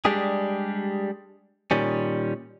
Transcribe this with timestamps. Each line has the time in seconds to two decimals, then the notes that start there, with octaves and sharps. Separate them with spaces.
0.05 G3 G#3 D4 G4 G#4
1.71 A#2 D#3 G3 C#4